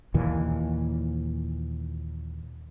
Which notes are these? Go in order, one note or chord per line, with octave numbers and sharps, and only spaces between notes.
D#2 A#2 E3